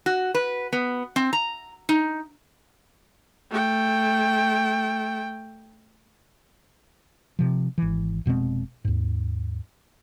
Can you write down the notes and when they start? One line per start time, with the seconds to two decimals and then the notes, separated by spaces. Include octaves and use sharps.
0.06 F#4
0.35 B4
0.73 B3
1.16 C4
1.33 A#5
1.89 D#4
3.50 A3 G5
7.39 C3 F3
7.78 G#1 E3
8.26 F1 B2 G#3 C4
8.85 D#2 G#2